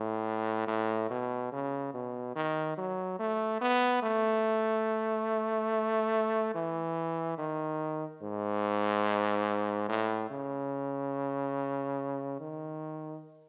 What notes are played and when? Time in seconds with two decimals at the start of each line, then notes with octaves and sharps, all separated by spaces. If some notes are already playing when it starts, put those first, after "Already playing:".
Already playing: A2
0.67 A2
1.10 B2
1.52 C#3
1.94 B2
2.35 D#3
2.77 F#3
3.19 A3
3.61 B3
4.02 A3
6.55 E3
7.38 D#3
8.22 G#2
9.89 A2
10.30 C#3
12.40 D#3